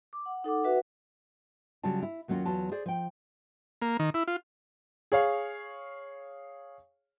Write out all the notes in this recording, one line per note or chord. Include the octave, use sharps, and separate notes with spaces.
D6
F#5
D#4 A4 F#5 D6
F#4 B4 E5 F#5
C#3 F#3 G3 F4 A5
E4
D#2 F#3 A#3 C#4 F4
E2 F#3 F4 A5
G#4 C5 D5
F3 G5
A#3
D#3
E4
F4
G#4 C#5 F5